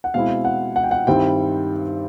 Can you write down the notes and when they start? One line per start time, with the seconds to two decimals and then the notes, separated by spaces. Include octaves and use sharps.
0.04 F#5
0.14 B2 G#3 C4 E4 F5
0.45 F#5
0.76 F#5
0.83 G5
0.91 F#5
1.07 G2 D#3 G3 C4 E4 G5